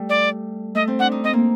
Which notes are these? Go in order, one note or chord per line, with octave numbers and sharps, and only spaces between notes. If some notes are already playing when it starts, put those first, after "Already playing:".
Already playing: G3 A3
D5
A3 D#5
C4
D4 F#5
D#4
C4 D#5
A#3